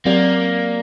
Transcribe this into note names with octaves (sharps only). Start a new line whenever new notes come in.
F#3 A#3 C4 G4 D5